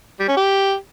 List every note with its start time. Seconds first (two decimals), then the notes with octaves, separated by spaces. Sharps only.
0.20 G3
0.28 C#4
0.37 G4